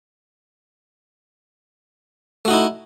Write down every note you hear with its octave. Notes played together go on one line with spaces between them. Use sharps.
A3 D#4 E4 F#4